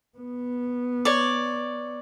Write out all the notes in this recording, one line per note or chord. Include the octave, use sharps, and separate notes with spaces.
B3
C#5 D5